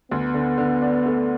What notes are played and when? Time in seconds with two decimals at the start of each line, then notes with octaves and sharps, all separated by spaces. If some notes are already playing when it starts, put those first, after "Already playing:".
0.11 D2 B3
0.34 D3
0.58 D3
0.82 D4
1.06 A3